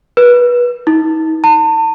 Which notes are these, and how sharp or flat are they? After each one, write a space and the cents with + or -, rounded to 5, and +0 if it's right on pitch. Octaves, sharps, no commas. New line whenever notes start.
B4 -25
D#4 +40
A5 +40